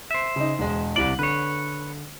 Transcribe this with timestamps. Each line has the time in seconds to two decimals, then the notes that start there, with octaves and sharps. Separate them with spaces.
0.11 C5 E5
0.36 C#3 D#4
0.59 E1 G#3
0.96 C2 C3 E4 D5 F#7
1.19 D3 B4 C#5